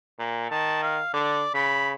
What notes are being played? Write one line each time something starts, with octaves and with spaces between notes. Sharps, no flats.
A#2
D#3 A5
F5
D3 D5
C#3 B5